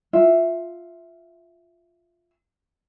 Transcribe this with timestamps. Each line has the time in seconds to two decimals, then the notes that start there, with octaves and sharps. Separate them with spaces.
0.13 F4 E5